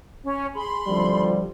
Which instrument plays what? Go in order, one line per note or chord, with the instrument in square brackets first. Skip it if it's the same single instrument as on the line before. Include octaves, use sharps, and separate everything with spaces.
[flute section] C#4 C#5
[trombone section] G#4 [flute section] B5 C6
[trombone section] G#1 D2 A4 [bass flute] F3 [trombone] G3